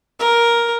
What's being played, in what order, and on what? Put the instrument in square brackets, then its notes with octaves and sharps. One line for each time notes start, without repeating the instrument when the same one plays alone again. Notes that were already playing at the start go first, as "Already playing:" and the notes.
[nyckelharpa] A#4